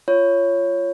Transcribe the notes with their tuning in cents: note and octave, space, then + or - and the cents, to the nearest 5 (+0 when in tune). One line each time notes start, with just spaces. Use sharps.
F4 -15 C#5 +0